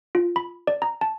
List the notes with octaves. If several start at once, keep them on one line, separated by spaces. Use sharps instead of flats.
F4
B5
D5
A#5
A5